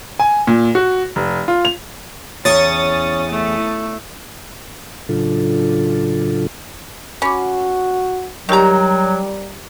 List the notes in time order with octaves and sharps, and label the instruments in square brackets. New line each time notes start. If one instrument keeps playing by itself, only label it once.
[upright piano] G#5
A#2
F#4
F1
F4
F7
[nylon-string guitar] E2 [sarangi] C#4 [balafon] C#5 [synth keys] C#6 D#6 A6
[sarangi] A3
[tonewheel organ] A2 C#3 F#3 D4 F4 A4
[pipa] C#4 [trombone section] F#4 [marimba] B5 D6
[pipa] D#3 A#5 [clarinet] F#3 [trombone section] G3 [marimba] G4 C#6